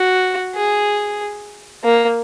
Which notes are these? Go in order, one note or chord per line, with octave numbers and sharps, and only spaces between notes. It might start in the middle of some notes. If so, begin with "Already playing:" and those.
Already playing: F#4
G#4
A#3